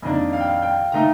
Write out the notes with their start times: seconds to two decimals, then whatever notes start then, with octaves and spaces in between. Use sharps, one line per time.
0.02 F2 D#3 A#3 D4 D#5
0.33 F5
0.40 G5
0.47 F5
0.62 G5
0.92 D#3 A3 D#4 A#5